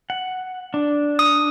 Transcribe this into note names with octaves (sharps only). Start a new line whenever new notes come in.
F#5
D4
D#6